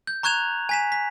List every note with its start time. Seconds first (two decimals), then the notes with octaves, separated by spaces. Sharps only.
0.07 G6
0.23 A#5 C#6 F#6 G#6 E7 F7
0.69 G#5 B6 E7
0.92 B6